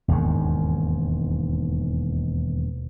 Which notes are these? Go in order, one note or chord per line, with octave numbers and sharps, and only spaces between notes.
E1 D#2 G#2 D#3